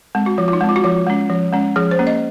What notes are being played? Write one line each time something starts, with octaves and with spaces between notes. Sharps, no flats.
G#3 C4
F#4
F3 F4
F4
D#4
G#3 C4
F4
F#4
F3 F4
G#3 C#4
F3
G#3 C#4
F3 G#4
C5
A#3 C#4
D#5